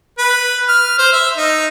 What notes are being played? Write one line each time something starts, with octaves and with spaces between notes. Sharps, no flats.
B4
F6
C5
E5
D#4